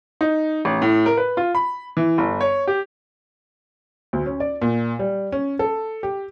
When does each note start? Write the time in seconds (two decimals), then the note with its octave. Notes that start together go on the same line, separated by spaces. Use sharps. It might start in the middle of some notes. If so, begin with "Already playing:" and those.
0.21 D#4
0.65 A1
0.82 A2
1.06 A#4
1.17 B4
1.37 F4
1.55 B5
1.97 E3
2.18 G1
2.41 C#5
2.67 G4
4.13 D2
4.26 C#4
4.40 D5
4.62 A#2
4.99 G3
5.32 C#4
5.59 A4
6.03 G4